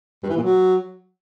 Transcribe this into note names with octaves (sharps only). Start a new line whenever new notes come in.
G2
E3
A#2
F#3